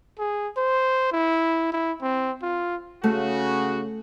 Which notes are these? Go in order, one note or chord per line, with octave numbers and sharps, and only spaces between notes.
G#4
C5
E4
E4
C4
F4
C#3 A3 F#4